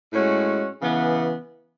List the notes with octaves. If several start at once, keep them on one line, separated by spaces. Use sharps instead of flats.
A2 G#3 C#4 F#4
C#3 E3 B3